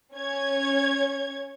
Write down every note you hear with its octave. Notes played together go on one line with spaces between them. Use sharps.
C#4 C#5 G#6